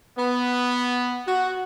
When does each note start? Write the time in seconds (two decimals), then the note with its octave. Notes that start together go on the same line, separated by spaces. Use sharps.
0.17 B3
1.26 F#4